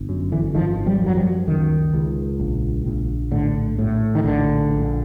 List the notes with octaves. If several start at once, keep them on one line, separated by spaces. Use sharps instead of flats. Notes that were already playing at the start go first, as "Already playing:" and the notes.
Already playing: G1
F#2
D3 E3
G#1 D#3 F3
F3 G3
F#2
F#3
F3 G3
C#2 D#3
C#2
A#1
A#1
A2 D3
A2
D#3
A#1 D3
A#1